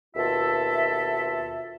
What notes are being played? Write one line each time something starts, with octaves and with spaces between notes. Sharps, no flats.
D#2 B2 F4 A4 E5